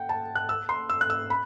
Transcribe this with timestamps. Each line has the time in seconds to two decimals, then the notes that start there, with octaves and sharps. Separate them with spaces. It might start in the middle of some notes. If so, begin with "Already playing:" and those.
Already playing: F#5 G5
0.09 A5
0.35 F#6
0.49 E6
0.69 C6
0.89 E6
1.01 F#6
1.10 E6
1.30 B5